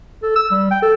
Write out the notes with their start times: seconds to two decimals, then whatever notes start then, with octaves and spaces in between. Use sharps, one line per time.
0.23 A4
0.36 E6
0.51 G3
0.71 G5
0.83 A4